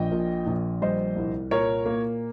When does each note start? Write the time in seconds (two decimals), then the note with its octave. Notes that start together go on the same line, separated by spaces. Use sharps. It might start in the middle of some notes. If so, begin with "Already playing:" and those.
Already playing: A#1 F3 D#5 G5
0.12 A#2
0.47 A#1
0.82 G3 C5 D#5
1.16 C2
1.51 A#2 A#4 C#5
1.86 A#3